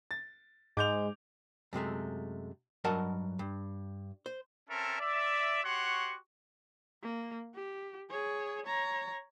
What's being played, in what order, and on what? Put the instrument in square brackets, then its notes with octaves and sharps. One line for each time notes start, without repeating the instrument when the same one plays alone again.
[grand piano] A6
[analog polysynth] G#2 [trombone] G#3 [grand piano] D6 G6 F7
[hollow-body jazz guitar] F#2 C3 G#3 A3
G2 F#3 A#4 D#5 F#5 A5
G2
C5
[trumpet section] C4 C#4 A4 A#4 E5 A5
D5 E5
F#4 G4 C#5 F#5 C6 C#6
[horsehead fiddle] A#3
G4
G#4 C#5
C#5 A#5